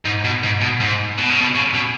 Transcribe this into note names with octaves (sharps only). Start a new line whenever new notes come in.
G#2
B2
G#2
B2
G#2
B2
C#3
B2
C#3
B2